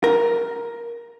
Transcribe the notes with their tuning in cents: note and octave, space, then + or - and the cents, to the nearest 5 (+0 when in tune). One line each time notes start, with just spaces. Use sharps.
A#4 +10